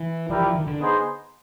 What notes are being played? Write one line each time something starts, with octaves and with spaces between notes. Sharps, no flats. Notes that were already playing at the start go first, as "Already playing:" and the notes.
Already playing: E3
F3 E4 G4 A#4 D5 G5
F3
D#3
D3
B3 D#4 G#4 C5